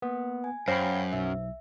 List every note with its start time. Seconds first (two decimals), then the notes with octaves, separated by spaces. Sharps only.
0.02 A#3 B3
0.44 G#5
0.68 F#2 C5 C#5 F5 G5 B5 A#6
1.13 B1 E5